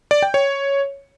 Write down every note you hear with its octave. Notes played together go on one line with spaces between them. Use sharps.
D5
G5
C#5